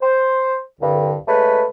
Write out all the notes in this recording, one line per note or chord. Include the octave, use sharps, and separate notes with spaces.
C5
C2 G2 D3
C#3 G#3 A3 B4